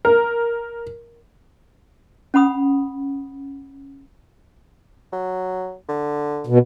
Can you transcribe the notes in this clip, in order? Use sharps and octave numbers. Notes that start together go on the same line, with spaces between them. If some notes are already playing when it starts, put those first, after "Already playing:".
A#4
C#4 F#5 B5 D#6
F#3
D3
B2